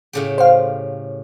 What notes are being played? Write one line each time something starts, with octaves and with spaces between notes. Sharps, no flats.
A2 C#3 G4
C5 F5